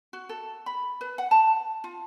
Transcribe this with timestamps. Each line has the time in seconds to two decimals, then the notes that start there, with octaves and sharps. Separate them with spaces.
0.13 F#4
0.29 A4
0.66 B5
1.01 B4
1.18 F#5
1.31 A5
1.84 F4